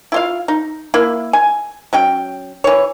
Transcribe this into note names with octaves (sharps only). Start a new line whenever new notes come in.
E4 F4 F5
D#4
A#3 E4
G#5
F#3 C#4 G5
E3 C#5